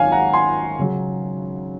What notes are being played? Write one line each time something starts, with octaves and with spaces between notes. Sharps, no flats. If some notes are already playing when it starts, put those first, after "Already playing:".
Already playing: G#1 D#3 F#3 C#5 F5 G#5
F#5 A#5
G#5 C6
C#3 F#3